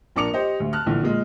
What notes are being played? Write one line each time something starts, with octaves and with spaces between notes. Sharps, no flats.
A#1 D4 A#4 D6 C#7 F7
G4 C5 D#5
D2
A5 F6 F#6
A#1 D3 E3
A#2 G#3